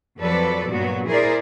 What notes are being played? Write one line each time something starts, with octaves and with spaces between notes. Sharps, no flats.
F2 F3 F#3 A4 B4 D5
G2 A#2 F#3 B3 F#4
E4 G#4 A#4 C5 D5